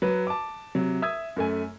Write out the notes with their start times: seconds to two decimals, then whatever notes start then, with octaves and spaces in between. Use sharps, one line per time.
0.02 F#3 B4
0.27 A5 D6
0.75 C3 F#3
1.02 E5 D#6 E6 G#6
1.36 F#2 A3 G#5